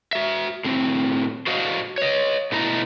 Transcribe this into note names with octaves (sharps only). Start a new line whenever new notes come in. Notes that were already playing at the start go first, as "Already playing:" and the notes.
F#4 E5
A2 C4
D4 F#4 C5 D#5 F5 F#5
C#5 D#5
B2 A3 E4 D#5 A#5